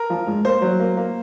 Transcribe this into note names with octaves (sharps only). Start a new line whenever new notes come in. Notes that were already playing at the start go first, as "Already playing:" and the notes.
Already playing: A#4
F3
G#2
A#3 C5
F#3
A#3
A#3